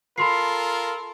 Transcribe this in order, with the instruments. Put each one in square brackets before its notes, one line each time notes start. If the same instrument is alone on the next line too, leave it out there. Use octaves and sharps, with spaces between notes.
[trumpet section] F4 A4 A#4 [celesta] B5 C6 C7